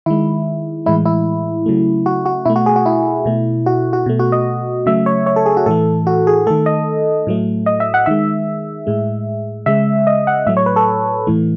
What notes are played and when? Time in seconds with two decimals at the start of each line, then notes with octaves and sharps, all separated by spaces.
0.06 D#3 G#3 E4
0.86 A2 E3 G#3 E4
1.05 E4
1.66 C#3 F#3 A3
2.06 F#4
2.26 F#4
2.45 B2 A3 E4
2.56 F#4
2.66 G#4
2.76 F#4
2.86 E4
3.26 B2 A3
3.66 F#4
3.93 F#4
4.06 B2 A3
4.19 F#4
4.32 D#5
4.86 C#3 F#3 A3 E5
5.06 C#5
5.26 C#5
5.36 A4
5.46 G#4
5.57 F#4
5.66 A2 E3 A3 A4
6.07 F#4
6.27 G#4
6.47 D#3 A3 A4
6.66 D#5
7.27 A2 F#3 A3
7.66 D#5
7.80 E5
7.94 F#5
8.06 D#3 G#3 E5
8.87 A2 G#3
9.66 C#3 G#3 E5
10.07 D#5
10.27 F#5
10.46 A2 F#3 A3 E5
10.57 C#5
10.66 B4
10.76 A4
11.27 A2 E3 A3